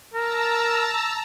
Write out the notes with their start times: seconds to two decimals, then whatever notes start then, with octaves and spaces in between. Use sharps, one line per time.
0.14 A#4 A5 A#5 E6